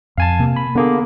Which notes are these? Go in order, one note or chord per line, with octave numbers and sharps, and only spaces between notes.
F2 F5 G#5 A5
C3 A#3
B5
D3 A#3 B3 G#4